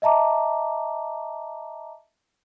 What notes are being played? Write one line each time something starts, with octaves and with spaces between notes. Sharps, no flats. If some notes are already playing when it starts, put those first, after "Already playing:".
D#5 E5 A5 A#5 D6